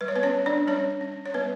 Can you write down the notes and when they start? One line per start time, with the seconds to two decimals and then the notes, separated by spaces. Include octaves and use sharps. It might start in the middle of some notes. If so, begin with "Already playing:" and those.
0.01 G3 B4
0.08 C#5
0.16 B3 B4
0.23 C#4 C#5
0.34 C#4
0.46 D4 D5
0.67 G3 C#4 C#5
1.01 C#4
1.26 C#5
1.34 G3 B3 B4